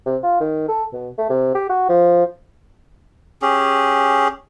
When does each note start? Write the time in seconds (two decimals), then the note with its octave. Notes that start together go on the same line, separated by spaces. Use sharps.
0.06 C3
0.23 F4
0.40 D#3
0.68 A4
0.93 B2
1.18 A3
1.30 C3
1.55 G4
1.70 F#4
1.89 F3
3.42 C#4 G4 G#4